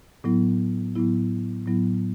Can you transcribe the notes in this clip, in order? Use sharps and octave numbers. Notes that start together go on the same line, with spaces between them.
A2 F#3 B3 E4
A2 F#3 B3 E4
A2 F#3 B3 E4